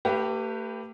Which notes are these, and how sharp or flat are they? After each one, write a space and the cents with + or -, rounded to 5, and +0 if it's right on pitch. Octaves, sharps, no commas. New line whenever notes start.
A3 +40 G4 -5 B4 +0